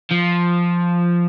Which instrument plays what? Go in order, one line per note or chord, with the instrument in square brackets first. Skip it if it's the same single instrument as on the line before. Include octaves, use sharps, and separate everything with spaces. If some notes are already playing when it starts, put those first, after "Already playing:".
[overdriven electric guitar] F3